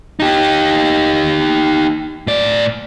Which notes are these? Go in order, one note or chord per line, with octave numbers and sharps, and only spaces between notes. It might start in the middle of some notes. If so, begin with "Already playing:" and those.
D#4 G4
A2 D5